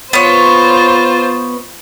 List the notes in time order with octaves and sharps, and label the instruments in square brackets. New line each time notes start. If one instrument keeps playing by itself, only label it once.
[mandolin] B3 C#5 [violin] F4 C5